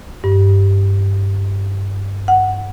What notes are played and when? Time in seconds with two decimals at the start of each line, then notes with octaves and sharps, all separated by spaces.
0.24 G2
2.28 F#5